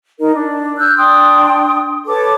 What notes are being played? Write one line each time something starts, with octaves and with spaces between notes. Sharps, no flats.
D#4 A#4 D#5
D4
E6 F#6 G6
D4 G5 C6 D#6
A4 B4 C#5 D6